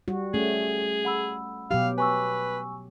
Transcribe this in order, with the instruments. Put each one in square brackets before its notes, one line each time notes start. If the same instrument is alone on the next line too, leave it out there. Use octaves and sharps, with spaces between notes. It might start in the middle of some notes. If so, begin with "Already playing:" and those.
[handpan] G3 F#4
[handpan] A3 C#4 [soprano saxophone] G#4
[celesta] F#5 B5 E6
[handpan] B2 F#3 G4 [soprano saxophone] F5
[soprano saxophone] B4 [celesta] G#5 C#6 E6